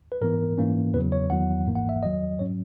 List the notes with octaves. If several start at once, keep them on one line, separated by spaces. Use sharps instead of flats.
B4
G#2 E3 B3 A#4
G#2 E3 A#3 C#4
E2 C#3 F#3 B4
C#5
E2 D#3 F#3 F#5
G#1 G#2 E3 A#3
F#5
E5
E2 D#3 F#3 D#5
G#2 F#3 C#4 C#5